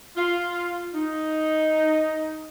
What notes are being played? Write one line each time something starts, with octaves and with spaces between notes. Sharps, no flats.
F4
D#4